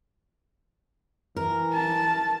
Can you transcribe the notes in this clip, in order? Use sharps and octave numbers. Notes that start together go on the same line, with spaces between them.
E3 A#4
A5